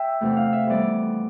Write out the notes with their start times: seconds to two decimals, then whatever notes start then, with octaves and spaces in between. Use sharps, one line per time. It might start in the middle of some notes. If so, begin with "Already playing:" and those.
Already playing: E5 G5
0.21 E2 C3 E3 A3
0.37 F5
0.53 E5
0.67 F2 E3 G3 B3 D5